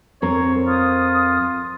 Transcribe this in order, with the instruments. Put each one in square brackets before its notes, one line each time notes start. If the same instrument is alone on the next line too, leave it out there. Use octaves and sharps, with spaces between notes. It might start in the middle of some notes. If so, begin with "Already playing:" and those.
[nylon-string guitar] F2 C4 A#4 [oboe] C#5
[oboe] F4 [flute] D#6